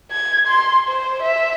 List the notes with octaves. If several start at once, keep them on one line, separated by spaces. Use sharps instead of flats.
G#6
C6
C5
E5